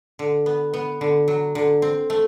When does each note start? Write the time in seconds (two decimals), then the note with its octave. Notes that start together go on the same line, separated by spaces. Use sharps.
0.19 D3
0.46 B3
0.74 B3
1.01 D3
1.28 F#3
1.55 D3
1.82 C4
2.10 A3